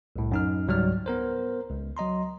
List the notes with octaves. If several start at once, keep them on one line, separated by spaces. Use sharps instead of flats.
C2 A2
F#2 D#4 F6
C#2 G#2 F#3 G3 D5 F6
B3 A#4 C5
C#2
F#3 D#5 A#5 C6